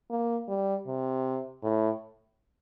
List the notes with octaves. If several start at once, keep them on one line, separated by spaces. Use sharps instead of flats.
A#3
G3
C3
A2